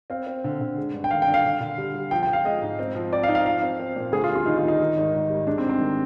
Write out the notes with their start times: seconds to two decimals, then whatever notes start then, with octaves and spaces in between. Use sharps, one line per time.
0.10 C4 F5
0.26 C4
0.44 D3
0.61 D3
0.77 G#3
0.93 G2
1.04 G5
1.11 D#3 F5
1.22 G5
1.27 D4
1.34 F5
1.45 D3
1.61 D3
1.78 G3
1.94 G3
2.11 F3 G5
2.23 G5
2.28 F3
2.33 F5
2.45 G#3 D#5
2.61 G#2
2.79 C4
2.95 F3
3.13 C4 D5
3.23 F5
3.28 D#4
3.35 F5
3.45 F3 F5
3.63 C4
3.80 C4
3.96 A#2
4.12 D2 G#4
4.24 F4
4.29 G3
4.35 F4
4.46 D#3 D#4
4.58 F4
4.63 D#3
4.68 D#4
4.80 D#3
4.97 G#1
5.13 G#2
5.29 G3
5.47 G#3 D4
5.58 C4
5.64 G#2
5.69 C4
5.80 D#3